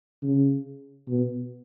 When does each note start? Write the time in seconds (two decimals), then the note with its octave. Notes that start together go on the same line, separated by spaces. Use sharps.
0.23 C#3
1.08 B2